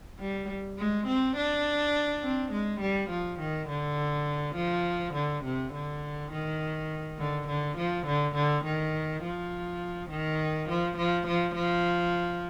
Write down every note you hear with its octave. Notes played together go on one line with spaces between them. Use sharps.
G3
G#3
C4
D4
C4
G#3
G3
F3
D#3
D3
F3
D3
C3
D3
D#3
D3
D3
F3
D3
D3
D#3
F3
D#3
F3
F3
F3
F3